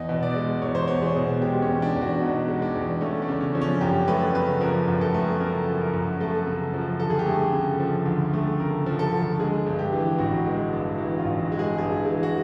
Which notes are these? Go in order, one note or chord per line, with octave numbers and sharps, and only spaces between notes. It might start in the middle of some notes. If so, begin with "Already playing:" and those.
Already playing: E2 D#5
B2
D5
G#3
E2 C#5
C5
E2 C#5
G#4
B2
G#3 G4
C#4
E2
D4
E2
F#4
B2 D#4
G#3
D4
E2
A3 C#4
D4
C#3
C#4
F3
C#4
F#2 G4
A3 B4
C#3 B4
F3 A#4
F#2
A4
A3
C#3 A#4
F3
A#4
F#2
A3 A4
C#3
F3
D2 A4
G#4
G4
A3 G#4
C#3
F3
D2
A3
C#3 A#4
F3
A4
D2
G#3 G#4
G2
G4
E3
A1 F#4
G#3
G2
E3 F#4
F4
A1
F#4
G#3
G#4
G2 G#4
E3 G#4
F#4